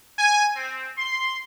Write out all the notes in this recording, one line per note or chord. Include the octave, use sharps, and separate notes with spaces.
G#5
C4
C6